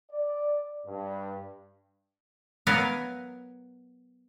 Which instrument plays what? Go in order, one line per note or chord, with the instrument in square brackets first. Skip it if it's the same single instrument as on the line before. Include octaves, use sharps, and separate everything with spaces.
[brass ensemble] D5
G2
[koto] F#3 B3 A#4 F5